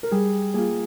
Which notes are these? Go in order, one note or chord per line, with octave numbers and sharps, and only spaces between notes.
A#4
G3 G#4
A#3 F4 G#4